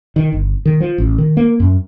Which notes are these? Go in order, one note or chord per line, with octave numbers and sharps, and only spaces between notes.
D#3
G1
D#3
F3
A1
D#3
A#3
F#2